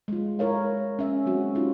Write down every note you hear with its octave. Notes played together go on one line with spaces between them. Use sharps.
G#3 F4
G#3 E4 A#4 C#5 F5
C#4 E5
F#3 G#3 C4 F#4
C4 C#4 D#4 F4 G4